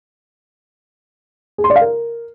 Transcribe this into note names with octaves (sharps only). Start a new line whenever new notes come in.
G#4
C6
D5
F5
A#4